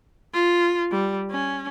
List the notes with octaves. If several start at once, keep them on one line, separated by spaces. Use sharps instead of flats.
F4
G3
C#4